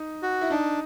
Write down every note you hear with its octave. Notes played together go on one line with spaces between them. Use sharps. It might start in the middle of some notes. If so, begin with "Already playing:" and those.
Already playing: D#4
F#4
E4
D4 D#4